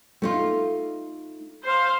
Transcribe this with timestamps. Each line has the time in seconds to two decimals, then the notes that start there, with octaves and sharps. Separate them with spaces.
0.22 A3 D#4 F4
1.64 C5 F5